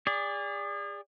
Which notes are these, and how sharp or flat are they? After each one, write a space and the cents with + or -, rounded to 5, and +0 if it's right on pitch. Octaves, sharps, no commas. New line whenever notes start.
G#4 -35 D5 -10